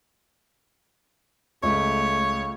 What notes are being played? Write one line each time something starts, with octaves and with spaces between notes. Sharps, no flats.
C#2 A3 C#5